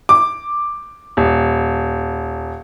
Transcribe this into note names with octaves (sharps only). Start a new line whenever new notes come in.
D6
D#1